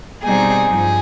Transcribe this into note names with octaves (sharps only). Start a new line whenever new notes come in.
B2 G3 C4 D#4 G#4
G2 F3 G#4